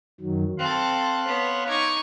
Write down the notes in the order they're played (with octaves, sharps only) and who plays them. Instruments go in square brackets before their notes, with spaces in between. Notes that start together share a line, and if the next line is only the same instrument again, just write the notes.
[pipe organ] F#2 D#3 F#3
[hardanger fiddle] C4 A4 [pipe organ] F5 C6 F#6
[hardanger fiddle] B3 C#5
[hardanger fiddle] D#4 C#6 [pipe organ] D6 G#6